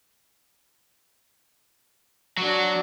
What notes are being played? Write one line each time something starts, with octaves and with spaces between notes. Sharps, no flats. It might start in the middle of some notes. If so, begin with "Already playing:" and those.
F#3 D4 F#4